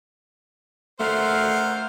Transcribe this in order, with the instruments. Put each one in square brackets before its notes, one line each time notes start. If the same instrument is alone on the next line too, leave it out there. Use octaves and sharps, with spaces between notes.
[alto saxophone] A3 [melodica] A#4 F#5 [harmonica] C5 [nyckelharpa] F5